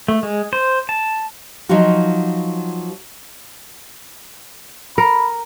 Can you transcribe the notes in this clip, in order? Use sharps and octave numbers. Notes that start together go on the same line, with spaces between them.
A3
G#3
C5
A5
F3 F#3 D#4 F4 F#4
A#4 B5